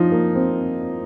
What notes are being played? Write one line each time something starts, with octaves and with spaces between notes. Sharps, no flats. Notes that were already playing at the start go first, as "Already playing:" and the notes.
Already playing: F3 D#4 F4
A#3
C4